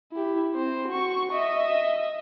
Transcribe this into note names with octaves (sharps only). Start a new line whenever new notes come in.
E4 G4
C4 C5
F#4 C#6
D#5 E5